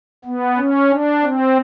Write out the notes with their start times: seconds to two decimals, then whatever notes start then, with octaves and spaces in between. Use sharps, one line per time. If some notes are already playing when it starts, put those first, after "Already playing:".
0.25 B3
0.57 C#4
0.90 D4
1.23 C4